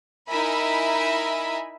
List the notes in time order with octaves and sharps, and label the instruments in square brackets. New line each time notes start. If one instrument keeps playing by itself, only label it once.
[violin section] D#4 E4 A#4 E5 G#5 B5